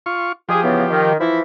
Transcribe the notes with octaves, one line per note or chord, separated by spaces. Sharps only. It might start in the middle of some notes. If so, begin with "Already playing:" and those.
F4 C#6
F3 G4 G#4
C#3 E3 B3
D#3
E3 F3 E4